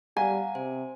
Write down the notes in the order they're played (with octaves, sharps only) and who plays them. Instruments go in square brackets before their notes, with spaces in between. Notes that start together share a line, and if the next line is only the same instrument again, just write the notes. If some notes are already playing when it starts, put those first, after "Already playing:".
[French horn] G3 [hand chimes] F5 F#5 A#5 [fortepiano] G#5
[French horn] C3 [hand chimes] C5